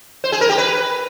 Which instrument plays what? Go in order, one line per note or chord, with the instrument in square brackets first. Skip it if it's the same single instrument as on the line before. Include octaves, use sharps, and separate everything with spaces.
[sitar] C5
G#4
A#4
G4
B4